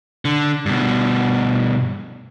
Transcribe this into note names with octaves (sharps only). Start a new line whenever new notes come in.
D3
G2 B2